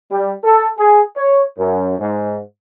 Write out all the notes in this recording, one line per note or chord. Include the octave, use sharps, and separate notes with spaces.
G3
A4
G#4
C#5
F#2
G#2